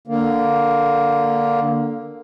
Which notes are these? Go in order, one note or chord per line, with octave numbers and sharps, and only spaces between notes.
D3 A#3